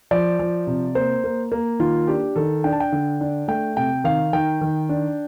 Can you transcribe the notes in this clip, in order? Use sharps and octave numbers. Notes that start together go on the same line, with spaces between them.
F3 D5
F3
C3
A#3 C5
A#3
A#3
D#3 F4
D4 G4
D#3 A4
D4 G5
A5
G5
D3
D4
A3 G5
C3 G5
D#3 F5
D#3 G5
D#3
D4